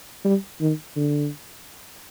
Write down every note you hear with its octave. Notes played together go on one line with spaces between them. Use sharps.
G3
D#3
D3